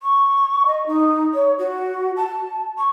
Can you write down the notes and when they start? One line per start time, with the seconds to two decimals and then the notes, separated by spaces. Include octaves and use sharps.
0.03 C#6
0.66 D#5
0.87 D#4
1.34 C#5
1.58 F#4
2.16 A5
2.78 C#6